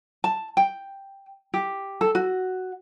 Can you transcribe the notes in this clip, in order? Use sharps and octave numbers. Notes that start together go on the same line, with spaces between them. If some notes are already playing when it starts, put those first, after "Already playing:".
A5
G5
G4
A4
F#4